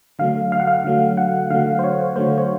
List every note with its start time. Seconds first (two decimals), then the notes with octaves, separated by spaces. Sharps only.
0.19 D3 F#3 A3 F5
0.52 F5
0.60 F#5
0.67 F5
0.84 D3 F#3 A3
1.17 F#5
1.50 D3 F#3 A3 F5
1.79 C5
1.84 C#5
2.16 D3 F#3 A3 C5
2.38 C#5